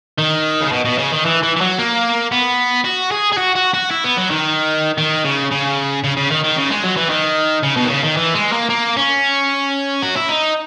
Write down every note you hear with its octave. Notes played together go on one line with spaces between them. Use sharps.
D#3
C#3
B2
B2
C#3
D#3
E3
E3
E3
F#3
A#3
B3
F#4
G#4
G#4
F#4
F#4
F#4
E4
B3
F#3
D#3
D#3
C#3
C#3
C#3
C#3
D#3
D#3
C#3
G#3
F#3
E3
D#3
C#3
B2
D#3
C#3
D#3
E3
G#3
A#3
A#3
C#4
F#4
E4
D#4